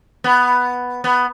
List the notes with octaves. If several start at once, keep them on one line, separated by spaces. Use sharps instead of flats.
B3
B3